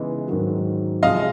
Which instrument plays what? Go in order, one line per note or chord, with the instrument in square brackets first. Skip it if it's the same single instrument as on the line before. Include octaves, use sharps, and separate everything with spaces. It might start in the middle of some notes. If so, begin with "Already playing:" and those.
Already playing: [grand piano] C#3 E3 G#3 B3 D#4
G#2 D#3 F#3 A#3
[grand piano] C3 F3 G#3 [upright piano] D#5 F5